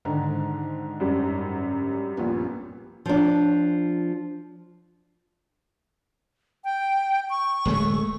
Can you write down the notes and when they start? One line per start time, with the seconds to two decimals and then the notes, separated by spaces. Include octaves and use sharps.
0.05 G#2 D3 D#3
1.00 F#2 G3
2.17 A#1 A#2 B3
3.06 F3 D4
6.64 G5
7.30 C#6
7.65 D1 G#3 A3